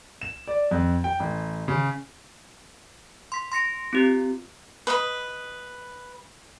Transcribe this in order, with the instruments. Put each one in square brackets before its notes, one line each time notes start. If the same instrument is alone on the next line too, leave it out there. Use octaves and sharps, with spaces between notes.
[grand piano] E7
D5
F2
G5
A1
C#3
[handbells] C6 B6
C6 A#6 C#7 D7
C4 F4 G4
[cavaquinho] B4 D#5 B5